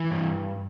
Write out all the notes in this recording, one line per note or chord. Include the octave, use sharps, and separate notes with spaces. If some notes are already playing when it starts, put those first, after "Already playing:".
Already playing: E3
G2